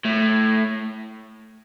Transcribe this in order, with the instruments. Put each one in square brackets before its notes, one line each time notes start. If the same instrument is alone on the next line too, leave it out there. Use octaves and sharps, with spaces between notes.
[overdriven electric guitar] A2